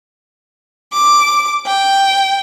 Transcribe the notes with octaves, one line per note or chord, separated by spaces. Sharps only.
D6
G5